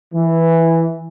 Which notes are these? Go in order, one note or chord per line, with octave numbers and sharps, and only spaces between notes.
E3